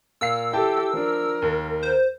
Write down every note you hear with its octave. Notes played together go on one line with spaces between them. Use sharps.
A#2 F5 E6 C7
E4 G4 A4 G5 A5
F3 D4 A#4
D#2
C5